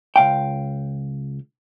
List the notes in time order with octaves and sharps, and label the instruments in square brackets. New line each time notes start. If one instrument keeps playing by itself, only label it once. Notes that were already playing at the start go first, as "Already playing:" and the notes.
[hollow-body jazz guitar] C#2 F5 G5